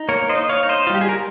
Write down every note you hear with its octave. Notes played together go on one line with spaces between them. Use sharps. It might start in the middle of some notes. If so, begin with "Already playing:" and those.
Already playing: D#4
A#3 A#4 C#5
C5 D#5
D#4
C#5 F5
D#4
C5 D#5
F4
G3 G4
G#4
A#4